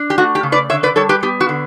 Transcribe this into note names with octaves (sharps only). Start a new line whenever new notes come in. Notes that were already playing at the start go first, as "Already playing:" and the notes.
Already playing: D4
G4
A3 F#4
G4
C#3
B4 D5
D3 C#5 E5
B4 D5
G3 A4 C#5
G4 B4
B3 G4
F#4
D3